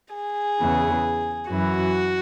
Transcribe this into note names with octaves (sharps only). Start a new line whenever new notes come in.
G#4
E2 C#3 E3
F#2 E3 F#4